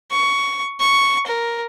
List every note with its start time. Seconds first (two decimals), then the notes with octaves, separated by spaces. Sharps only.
0.11 C#6
0.80 C#6
1.27 A#4